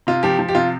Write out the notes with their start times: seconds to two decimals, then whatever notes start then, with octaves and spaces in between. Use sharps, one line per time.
0.07 C3 F4
0.23 F3 G4
0.39 F3
0.48 G4
0.55 C3 F4